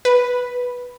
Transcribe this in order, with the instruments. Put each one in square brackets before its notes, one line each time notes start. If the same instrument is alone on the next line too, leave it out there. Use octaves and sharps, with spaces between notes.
[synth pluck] B4